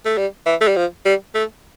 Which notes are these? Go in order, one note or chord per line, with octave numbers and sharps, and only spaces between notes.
A3
G3
E3
A3
G3
F3
G3
A3